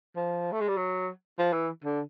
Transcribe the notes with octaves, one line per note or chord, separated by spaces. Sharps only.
F3
A3
G#3
G3
F#3
F3
E3
D3